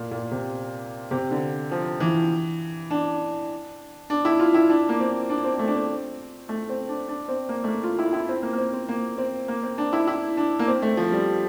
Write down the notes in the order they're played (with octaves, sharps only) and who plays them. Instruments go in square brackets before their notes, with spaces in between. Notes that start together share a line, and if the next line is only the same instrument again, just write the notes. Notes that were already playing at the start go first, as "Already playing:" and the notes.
Already playing: [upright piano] A#2
A#2
C3
C3
D3
F3
E3
D4
D4
E4
F4
E4
D4
A#3
C4
D4
C4
A3
D4
C4
A3
C4
D4
D4
C4
A#3
A3
A#3
F4
E4
E4
C4
A#3
A#3
C4
C4
A#3
C4
A#3
C4
D4
E4
E4
D4
A#3
C4
A3
F3
G3